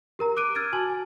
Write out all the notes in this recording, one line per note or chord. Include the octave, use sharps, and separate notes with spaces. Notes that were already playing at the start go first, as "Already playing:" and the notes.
G4 A#4 A#5
D6 F#6 D7 D#7
E6 F6 G#6 A6 D7 D#7
F#4 G#5 A5 F#7
G#5